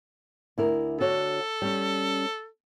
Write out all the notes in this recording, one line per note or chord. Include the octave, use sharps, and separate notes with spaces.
D2 E4 A#4
D3 F#4 A4 C#5
G3 C#4